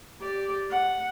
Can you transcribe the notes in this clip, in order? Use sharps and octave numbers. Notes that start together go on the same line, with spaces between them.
G4 D5
F#5